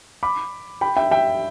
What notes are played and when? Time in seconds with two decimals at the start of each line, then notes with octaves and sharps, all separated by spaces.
0.23 B5 D6
0.81 G5 B5
0.96 E5 G5
1.11 E5 G5